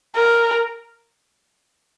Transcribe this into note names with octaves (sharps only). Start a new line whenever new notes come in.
A#4